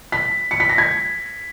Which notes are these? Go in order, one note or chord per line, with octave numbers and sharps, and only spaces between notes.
B6
C#7
B6
A#6
G#6